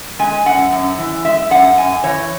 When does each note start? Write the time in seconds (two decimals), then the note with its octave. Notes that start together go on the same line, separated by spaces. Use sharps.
0.19 G#3 G#5
0.46 F#2 F#5
0.73 F#2
0.98 E3
1.25 G#3 E5
1.51 F#2 F#5
1.77 F#2 G#5
2.04 E3 C#5